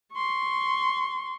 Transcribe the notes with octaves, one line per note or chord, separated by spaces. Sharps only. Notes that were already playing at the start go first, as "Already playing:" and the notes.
C6 C#6